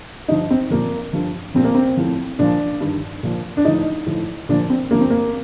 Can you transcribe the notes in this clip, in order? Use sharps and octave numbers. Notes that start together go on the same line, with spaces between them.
G2 F3 D#4
C4
A#2 F3 A#3
G2 F3
A#2 F3 C4
A#3
C4
A2 F3
A#2 F3 D4
G2 D#3
A#2 F3
D4
A2 F3 D#4
A2 F3
A#2 F3 D4
C4
G2 F3 A#3
C4
A#3